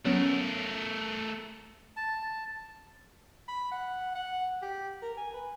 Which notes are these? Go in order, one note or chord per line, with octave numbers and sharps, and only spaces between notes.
F#3 A3 B3 C#4 A#4
A5
B5
F#5
F#5
G4
A#4
G#5
B4